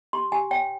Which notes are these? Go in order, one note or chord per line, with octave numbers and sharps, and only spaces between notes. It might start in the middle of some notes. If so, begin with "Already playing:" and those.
G4 C6
G4 G#5
C#5 G5